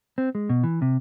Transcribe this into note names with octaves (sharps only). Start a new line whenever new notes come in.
C4
G#3
B2
E3
C3